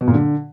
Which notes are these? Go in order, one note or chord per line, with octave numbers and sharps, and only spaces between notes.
B2
A#2
D3